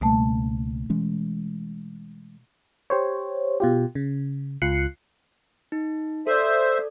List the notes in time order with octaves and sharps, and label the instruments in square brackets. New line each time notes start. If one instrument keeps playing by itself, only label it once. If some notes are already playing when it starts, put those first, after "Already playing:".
[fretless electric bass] C#2 G3 A#3 [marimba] B2 A3 A5
[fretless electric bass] E3 G#3 C#4
[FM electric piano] G4 C5 C#5
B2 F4 G4
C#3
C#2 F4 F#6 C7 C#7
[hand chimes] D#4
[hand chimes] A4 D5 [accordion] C5 E5